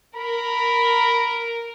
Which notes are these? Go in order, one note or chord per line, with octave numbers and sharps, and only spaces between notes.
A#4 B5